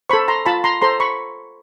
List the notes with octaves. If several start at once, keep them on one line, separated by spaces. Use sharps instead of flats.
A4 C5 B5 C#6
A#5 C6
F4 A5 B5
A#5 C6
A4 C5 A#5 C6
B5 C#6